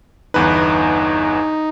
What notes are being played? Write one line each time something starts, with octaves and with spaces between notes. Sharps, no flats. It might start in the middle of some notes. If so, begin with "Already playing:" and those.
G1 E2 D#4 B4